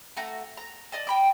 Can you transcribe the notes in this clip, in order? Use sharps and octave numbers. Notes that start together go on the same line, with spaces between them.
A3 F#4 A#5
A#5
D5 D#5 A5
G5 B5 D6